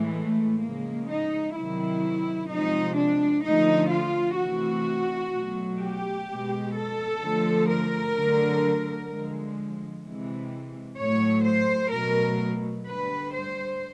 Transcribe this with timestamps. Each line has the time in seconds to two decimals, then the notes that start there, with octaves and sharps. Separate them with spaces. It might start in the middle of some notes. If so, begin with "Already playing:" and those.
Already playing: A2 E3 G#3
0.15 A3
0.61 C#3 F3 G#3 A#3
1.09 D#4
1.55 C3 D#3 F#3 E4
2.50 C3 F3 G#3 D#4
2.97 D4
3.44 D3 F3 A3 D#4
3.91 F4
4.38 C3 E3 A3 F#4
5.33 B2 F#3 A3
5.80 G4
6.28 B2 G#3
6.74 A4
7.22 D3 F3 A3
7.69 A#4
8.15 D3 F#3 A3
9.09 D3 F3 G#3
10.04 C3 E3 G#3
10.99 A2 F#3 A3 C#5
11.45 C5
11.92 B2 F#3 A3 A#4
12.86 D3 G3 B4
13.33 C5